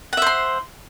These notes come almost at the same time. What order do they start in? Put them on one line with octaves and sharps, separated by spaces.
F#5 E5 C5 C6